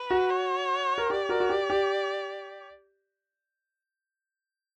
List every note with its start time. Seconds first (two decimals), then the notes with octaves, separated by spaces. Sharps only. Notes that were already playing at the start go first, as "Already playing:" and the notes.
Already playing: B4
0.11 F#4
0.31 C#5
0.98 A#4
1.10 G4 D5
1.29 F#4 A#4
1.40 F#4
1.49 G4
1.70 G4